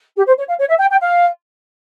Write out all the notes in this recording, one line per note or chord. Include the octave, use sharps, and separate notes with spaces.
G4
C5
C#5
F5
C#5
E5
G5
G5
F5